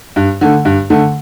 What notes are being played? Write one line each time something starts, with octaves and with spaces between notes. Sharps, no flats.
G2
D3 A3
G2
D3 A3